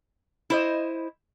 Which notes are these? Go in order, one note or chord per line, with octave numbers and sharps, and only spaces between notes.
E4 C5 D#5